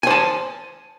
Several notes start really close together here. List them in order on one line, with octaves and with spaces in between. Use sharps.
G#5 C5 A5